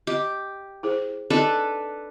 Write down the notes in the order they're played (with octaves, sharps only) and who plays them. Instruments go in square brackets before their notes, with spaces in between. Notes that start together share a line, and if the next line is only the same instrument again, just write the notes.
[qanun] G4 [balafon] D#5
[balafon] E4 G#4 C5
[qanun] D4 A4 B4 [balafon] D#4 G4 D#5